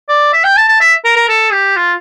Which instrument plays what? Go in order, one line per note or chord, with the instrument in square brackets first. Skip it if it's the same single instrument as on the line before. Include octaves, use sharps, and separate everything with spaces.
[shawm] D5
E5
G5
A5
A5
E5
A#4
A#4
A4
G4
F4